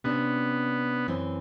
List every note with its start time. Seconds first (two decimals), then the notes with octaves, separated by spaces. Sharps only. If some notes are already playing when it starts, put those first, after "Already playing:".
0.04 C3 B3 C#4 D4
1.08 F#2 E3 C4